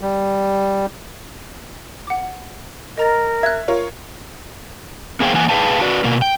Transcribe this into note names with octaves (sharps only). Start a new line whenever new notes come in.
G3
F#5 D6
A#4 D#5 A#5 A6
E5 F#6 G#6
F4 A#4 C#5
A#3 B3 G#4 C5 F5 G5
E3 A#3 F#5 G#5
G#4 B4 F5 G5 A5
F#4 B4 D5
B2 A#3
G5